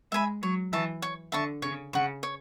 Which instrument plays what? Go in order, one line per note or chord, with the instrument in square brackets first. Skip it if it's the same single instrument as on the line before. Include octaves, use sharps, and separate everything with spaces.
[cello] G#3 [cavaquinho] E5 G#5 B5
[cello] F#3 [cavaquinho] C#5
[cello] E3 [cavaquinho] E5 A5 C#6
[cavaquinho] C#5
[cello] D3 [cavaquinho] E5 A5 C#6
[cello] C#3 [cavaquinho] C#5
[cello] C#3 [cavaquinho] F#5 C#6
[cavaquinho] C#5